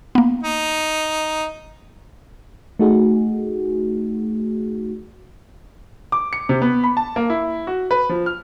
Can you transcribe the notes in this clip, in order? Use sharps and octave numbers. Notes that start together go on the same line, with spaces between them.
A#3 B3
D#4
A3 D#4 F#4 G#4
D6
C#7
C3
B3
B5
A5
A#3
E4
F#4
B4
F3
F6